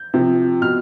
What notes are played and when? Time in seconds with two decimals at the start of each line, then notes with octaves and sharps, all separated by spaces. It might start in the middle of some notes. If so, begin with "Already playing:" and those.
Already playing: G6
0.14 C3 F3
0.61 B2 F6